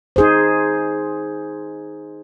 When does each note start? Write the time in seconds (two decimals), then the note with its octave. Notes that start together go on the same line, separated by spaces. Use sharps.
0.16 D#4 G#4 C5